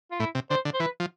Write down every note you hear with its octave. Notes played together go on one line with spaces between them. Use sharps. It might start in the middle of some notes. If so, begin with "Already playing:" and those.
F4
A2 E4
C3
D3 C5
D3
C5
E3 B4
F3